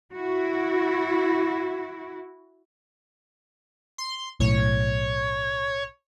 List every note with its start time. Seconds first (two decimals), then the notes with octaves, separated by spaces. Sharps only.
0.14 E4 F#4
3.98 C6
4.40 B1 A2 C#5